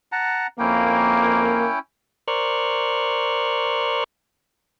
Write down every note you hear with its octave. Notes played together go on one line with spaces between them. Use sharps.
F#5 A5 A#5
F2 A#3 C#4 E4 G5
A#4 C5 D5 C#6 F6 F#6